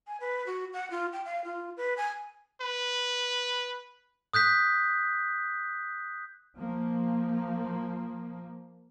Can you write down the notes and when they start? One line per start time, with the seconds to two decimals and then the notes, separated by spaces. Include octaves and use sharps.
0.08 G#5
0.20 B4
0.46 F#4
0.73 F#5
0.91 F4
1.13 G5
1.25 F5
1.44 F4
1.77 B4
1.97 G#5
2.61 B4
4.33 D#6 F#6 G6 B6
6.58 F3 A#3